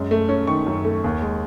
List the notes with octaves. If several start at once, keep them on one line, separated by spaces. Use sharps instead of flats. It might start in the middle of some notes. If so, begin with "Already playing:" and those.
Already playing: F#2 G#3
A3
C#4
D#3 C#6
F#2
A3
D#2
G#3